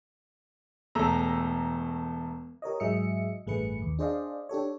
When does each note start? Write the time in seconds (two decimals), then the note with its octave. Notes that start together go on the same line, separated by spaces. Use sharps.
0.95 E1 A3 A#5 E6
2.62 G4 A#4 C#5 D#5
2.80 G#2 F#3 G#4 D#5 E5 C#7
3.46 A1 G2 A3 G#4 B4 C#7
3.82 D#2
3.99 D4 G#4 C5 D5 D#5 F5
4.49 D4 G4 A4 C#5